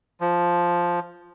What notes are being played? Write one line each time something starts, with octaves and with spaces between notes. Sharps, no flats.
F3